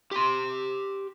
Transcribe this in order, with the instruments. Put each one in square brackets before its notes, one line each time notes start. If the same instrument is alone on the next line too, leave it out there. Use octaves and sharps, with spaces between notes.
[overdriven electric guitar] G4 C6